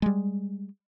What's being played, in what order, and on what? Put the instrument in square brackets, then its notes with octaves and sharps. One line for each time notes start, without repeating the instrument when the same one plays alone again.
[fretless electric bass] G3 G#3